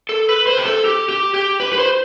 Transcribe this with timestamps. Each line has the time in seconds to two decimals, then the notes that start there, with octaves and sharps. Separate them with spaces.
0.09 A4
0.29 B4
0.47 C5
0.57 G4
0.65 A4
0.85 G4
1.09 G4
1.34 G4
1.60 B4
1.73 B4
1.79 C5